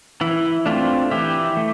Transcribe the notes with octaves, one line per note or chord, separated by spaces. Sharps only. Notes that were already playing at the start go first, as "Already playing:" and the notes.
E3 E4
A3 C4 D4 F4
E3 E4 G4
A3